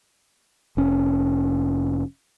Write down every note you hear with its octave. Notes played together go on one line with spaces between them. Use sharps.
F1 C#4